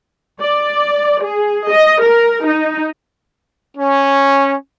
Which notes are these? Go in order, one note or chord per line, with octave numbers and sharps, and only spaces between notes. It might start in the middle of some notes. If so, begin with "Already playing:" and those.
D5
G#4
D#5
A#4
D#4
C#4